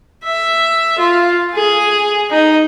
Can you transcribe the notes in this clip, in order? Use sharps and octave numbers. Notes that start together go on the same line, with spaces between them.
E5
F4
G#4
D#4